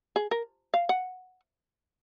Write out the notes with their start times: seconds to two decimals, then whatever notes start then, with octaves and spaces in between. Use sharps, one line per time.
0.16 G#4
0.31 A#4
0.74 F5
0.89 F#5